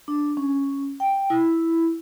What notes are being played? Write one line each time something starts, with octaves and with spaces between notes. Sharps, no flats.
D4
C#4
G5
E4